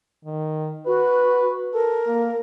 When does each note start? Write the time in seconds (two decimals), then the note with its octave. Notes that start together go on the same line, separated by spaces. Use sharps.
0.25 D#3
0.87 F#4 B4
1.73 A4 A#4
2.07 A#3